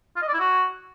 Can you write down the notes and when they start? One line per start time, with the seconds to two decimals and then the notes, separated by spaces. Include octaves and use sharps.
0.16 F4
0.22 D#5
0.28 D5
0.34 E4
0.39 F#4